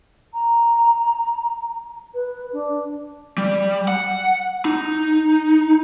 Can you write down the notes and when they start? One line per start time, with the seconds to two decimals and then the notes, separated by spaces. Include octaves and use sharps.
0.34 A#5
2.14 B4
2.53 D4
3.38 G3
3.88 F#5
4.65 D#4